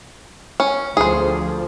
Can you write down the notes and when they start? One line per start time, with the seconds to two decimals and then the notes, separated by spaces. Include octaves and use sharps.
0.60 C#4
0.97 D2 F3 G#4 C5